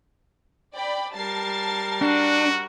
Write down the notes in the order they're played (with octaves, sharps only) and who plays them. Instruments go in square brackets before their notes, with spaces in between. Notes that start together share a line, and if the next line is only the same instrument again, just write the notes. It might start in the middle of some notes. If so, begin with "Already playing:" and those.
[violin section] D5 G5 B5
[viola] G3 A#4 [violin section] A5 A6 C7
[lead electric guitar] D4 [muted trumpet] F#4